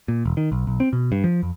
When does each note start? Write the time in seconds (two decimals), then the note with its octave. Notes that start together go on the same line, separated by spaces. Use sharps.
0.08 A#2
0.25 E1
0.37 D#3
0.52 B1
0.67 B1
0.80 C4
0.93 B2
1.12 G2
1.24 F3
1.43 F2